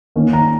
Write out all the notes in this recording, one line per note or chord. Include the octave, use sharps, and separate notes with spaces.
D#3 A#3 C#4
A#5